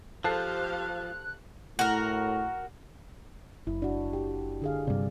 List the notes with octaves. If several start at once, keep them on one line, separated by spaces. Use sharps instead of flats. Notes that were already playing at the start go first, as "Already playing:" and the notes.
F3 G4 A4 C5 F5 A5 F#6 C7
A2 F#4 A#4
F#1 E4
D4 F#4
G4
D3 G#4 F5
G2 C3 D5